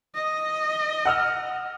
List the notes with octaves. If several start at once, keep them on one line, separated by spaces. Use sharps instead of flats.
D#5
F#5 E6 F6